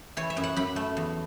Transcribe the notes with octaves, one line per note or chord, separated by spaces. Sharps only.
E3 C#5
E5
F#2
F#5
F#2 B5
A3
E2